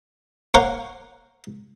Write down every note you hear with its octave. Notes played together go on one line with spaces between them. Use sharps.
A#3 A#4 C5 C#5 F5 F#5